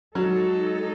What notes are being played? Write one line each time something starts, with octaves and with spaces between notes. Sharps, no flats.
F#3 G#3 D#4 A4